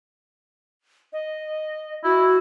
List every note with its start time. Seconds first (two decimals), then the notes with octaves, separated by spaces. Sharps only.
1.13 D#5
2.04 E4 F#4